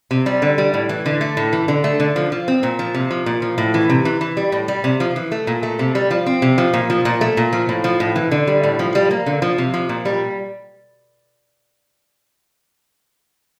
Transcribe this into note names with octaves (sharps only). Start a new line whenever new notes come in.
C3
G3
D3
G3
A2
E3
D3
A3
A2
E3
D3
A3
D3
F3
F3
C4
A#2
F3
C3
F3
A#2
F3
A2
E3
C3
E3
E3
G3
A2
G3
C3
F3
E3
A3
A#2
A3
C3
G3
F3
C4
C3
F3
A#2
F3
A#2
A3
A#2
F3
A2
F3
A2
E3
D3
G3
A2
F3
G3
A#3
D3
F3
C3
F3
A#2
G3